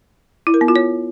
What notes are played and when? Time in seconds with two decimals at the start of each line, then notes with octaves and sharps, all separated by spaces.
0.47 E4
0.54 A#4
0.61 B3
0.68 F4
0.76 C#5